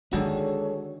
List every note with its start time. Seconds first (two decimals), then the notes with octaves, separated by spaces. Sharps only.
0.13 D3 D#3 G#3 A#3 F#4 G#4 A4 C#5